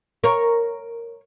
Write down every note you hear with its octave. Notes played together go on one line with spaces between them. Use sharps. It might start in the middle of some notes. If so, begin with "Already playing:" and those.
A#4 C#5